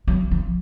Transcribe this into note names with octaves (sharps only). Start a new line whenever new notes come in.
F#3
F3